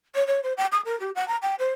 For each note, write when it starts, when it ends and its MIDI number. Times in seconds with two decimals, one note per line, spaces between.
0.15 0.26 73
0.27 0.40 73
0.43 0.53 72
0.57 0.66 79
0.72 0.81 87
0.85 0.98 70
1.00 1.10 67
1.15 1.27 78
1.28 1.36 82
1.42 1.55 79
1.59 1.70 72